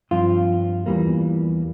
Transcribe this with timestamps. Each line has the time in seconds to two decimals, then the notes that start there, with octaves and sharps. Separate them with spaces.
0.11 G2 F3 C4 F4
0.86 E2 E3 G3 A#3